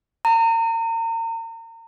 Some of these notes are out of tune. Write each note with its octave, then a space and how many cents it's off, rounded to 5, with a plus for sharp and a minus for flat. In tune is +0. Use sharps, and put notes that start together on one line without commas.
A#5 -35